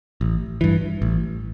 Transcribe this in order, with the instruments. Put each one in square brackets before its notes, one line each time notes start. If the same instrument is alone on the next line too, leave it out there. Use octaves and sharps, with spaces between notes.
[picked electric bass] A1
G2 E3
A1